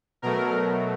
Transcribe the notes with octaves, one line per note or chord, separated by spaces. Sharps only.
B2 F#3 A3 A#4